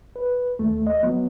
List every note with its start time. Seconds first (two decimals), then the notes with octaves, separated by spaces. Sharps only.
0.16 B4
0.59 D#2 A3
0.87 D#5
1.03 F#3 B3